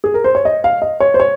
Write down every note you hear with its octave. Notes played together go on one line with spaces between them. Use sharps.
G#4
A#4
C5
C#5
D#5
F5
D#5
C#5
C5
C#5